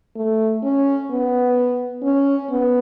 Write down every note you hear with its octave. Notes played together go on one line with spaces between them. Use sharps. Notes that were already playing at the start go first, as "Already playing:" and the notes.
A3
C#4
B3
C#4
B3